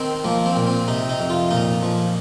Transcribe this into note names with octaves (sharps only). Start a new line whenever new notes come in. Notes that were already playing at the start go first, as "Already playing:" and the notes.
Already playing: D#3 C4
F3 A#3
C4
A#2
C4
C3 D#4
D#4
F2
F4
A#2 D#4
F3